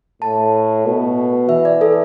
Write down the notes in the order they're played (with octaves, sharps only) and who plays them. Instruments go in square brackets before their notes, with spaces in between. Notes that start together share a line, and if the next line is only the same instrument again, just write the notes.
[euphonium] A2 [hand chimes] A5
[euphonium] B2
[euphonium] E3 [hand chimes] E5
[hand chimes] D5
A4